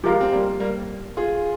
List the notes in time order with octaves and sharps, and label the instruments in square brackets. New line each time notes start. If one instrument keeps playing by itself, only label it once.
[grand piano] F3 G#3 [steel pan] G4 A#4 F5 A#5
[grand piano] C4
G3 A#3
G3 A#3
F4 G#4